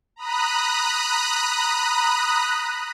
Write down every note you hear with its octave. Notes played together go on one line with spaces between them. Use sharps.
A#5 B5 D#6 F#6